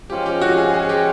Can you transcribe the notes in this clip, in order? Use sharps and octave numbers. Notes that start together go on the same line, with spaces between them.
G#2 F3 G#3 C#4 F4 G4
G4
F#4
G#4
G#4
G4